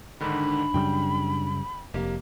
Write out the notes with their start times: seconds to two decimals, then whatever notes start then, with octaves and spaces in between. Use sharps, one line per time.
0.21 G#2 D3 D#3 D4 B5
0.74 F#2 C#3 G3 G5
1.94 F1 A#3 G4